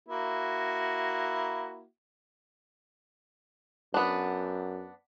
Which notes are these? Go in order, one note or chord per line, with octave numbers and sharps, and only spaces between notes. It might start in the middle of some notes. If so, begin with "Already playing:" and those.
A#3 E4 F#4
F#2 B3 D4